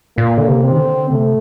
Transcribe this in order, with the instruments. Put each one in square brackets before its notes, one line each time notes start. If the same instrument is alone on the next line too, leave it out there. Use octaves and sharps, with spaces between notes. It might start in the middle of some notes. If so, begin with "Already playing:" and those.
[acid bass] A#2 [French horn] A#3
[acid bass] D3
C3
[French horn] C4
[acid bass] D#3
D3
[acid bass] C3 [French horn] A3